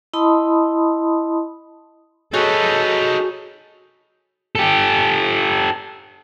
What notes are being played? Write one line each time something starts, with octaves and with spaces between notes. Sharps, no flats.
E4 D#5 A5 B5 C6 D#6
D#4 F#4 G#4 A4 B4 C#5
G4 A4